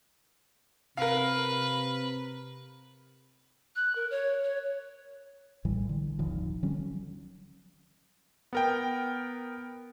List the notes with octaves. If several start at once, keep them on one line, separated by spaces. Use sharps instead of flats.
C3 A#4 B4 F5
F#6
A#4
C#5
C#5
A#1 A2 E3 G3
D3
D#1 G#1 D#3 F3
D3 F#3 G3 C#4
B3 A#4 G5